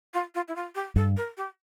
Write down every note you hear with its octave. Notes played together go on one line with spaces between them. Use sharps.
F4
F4
E4
F4
G4
G2 A4
A#4
G4